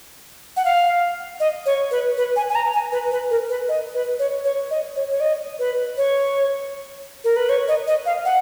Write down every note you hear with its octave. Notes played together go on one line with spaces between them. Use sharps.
F#5
F5
D#5
C#5
B4
B4
G#5
G#5
A#5
G#5
B4
B4
A#4
B4
D#5
B4
C#5
C#5
D#5
C#5
C#5
D#5
B4
C#5
A#4
B4
C#5
D#5
D#5
F5
F#5